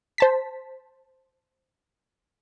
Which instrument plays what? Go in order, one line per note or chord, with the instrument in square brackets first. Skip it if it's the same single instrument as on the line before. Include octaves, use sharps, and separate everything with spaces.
[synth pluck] C5 A5 B6